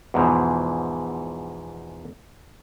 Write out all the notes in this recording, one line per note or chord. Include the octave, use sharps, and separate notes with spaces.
E2 G#2 B2 E3 F3